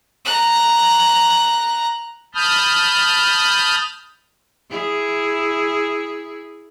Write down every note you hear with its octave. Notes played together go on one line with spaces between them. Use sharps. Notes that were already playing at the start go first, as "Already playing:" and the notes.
A#5 F#6
A5 B5 D#6 F6 G6
E4 G#4